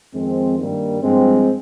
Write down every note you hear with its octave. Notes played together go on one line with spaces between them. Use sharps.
F2 D#3 G#3 C4
G2 D#3 G3 A#3
G2 F3 G#3 C4